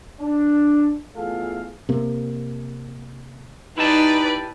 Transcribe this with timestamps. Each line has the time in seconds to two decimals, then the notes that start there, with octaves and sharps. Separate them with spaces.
0.21 D4
1.16 E2 A3 F4 G#4 A4 F5
1.89 C3 A#3
3.78 D#4 E4 G4 B4 D5 A5